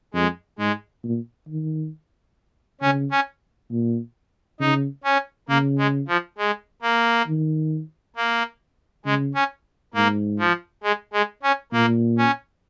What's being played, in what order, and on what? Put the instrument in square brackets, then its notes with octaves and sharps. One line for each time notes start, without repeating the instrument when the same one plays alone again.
[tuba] F2 [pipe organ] G#3
[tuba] G#2 [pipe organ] G#3
[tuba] A#2
D#3
[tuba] C#3 [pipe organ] C#4
[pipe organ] C#4
[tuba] A#2
[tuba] C#3 [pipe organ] D#4
[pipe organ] C#4
[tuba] C#3 [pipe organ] A#3
[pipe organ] G#3
F3
G#3
A#3
[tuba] D#3
[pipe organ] A#3
[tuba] C#3 [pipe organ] G#3
[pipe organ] C#4
[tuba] G#2 [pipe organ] A#3
[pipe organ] F3
G#3
G#3
C#4
[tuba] A#2 [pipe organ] A#3
[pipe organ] C#4